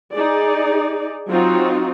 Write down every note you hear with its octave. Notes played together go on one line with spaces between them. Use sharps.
D#4 G#4 D5
F#3 C4 D#4 F4 F#4